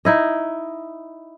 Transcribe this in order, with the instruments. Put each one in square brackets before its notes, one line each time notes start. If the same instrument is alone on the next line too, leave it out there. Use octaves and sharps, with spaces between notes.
[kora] D#4 E4 D#5